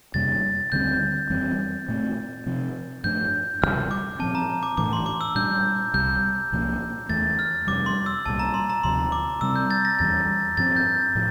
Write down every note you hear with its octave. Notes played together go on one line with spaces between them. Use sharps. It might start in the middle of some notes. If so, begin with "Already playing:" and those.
F2 C3 G3 A#3 A6
D2 D3 G3 C4 G6
F2 E3 G3 C4
A#2 A3 C4
C3 F3 C4
G2 F3 A3 D4 G6
D2 C3 G3 F6
D6
A#2 F3 C4 A5
A#5
D6
A2 E3 A3 D4 D6
C6
D6
E6
A#2 G3 D4 G6
C2 C3 G3 G6
C2 A#2 F3 A#3
E2 E3 A3 A6
F6
F2 C3 G3 D6
C6
E6
C2 A#2 G3 A5
A#5
C6
A#5
D2 C3 F3 C6
D6
C3 G3 C4 E6
G6
A6
A#6
E2 E3 G3 A6
G2 F3 C4 A6
G6
A2 F3